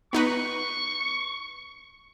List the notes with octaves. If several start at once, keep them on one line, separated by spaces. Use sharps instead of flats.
B3 D#4 B4 C#6